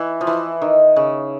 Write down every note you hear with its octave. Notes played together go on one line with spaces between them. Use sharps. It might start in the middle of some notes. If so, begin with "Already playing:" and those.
Already playing: E3
F3
E3
D#3
C#3